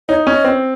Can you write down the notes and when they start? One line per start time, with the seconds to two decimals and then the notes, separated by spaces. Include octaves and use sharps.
0.09 D#4 C#5
0.26 C#4 D#5
0.44 C4